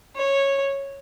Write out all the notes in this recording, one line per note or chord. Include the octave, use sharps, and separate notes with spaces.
C#5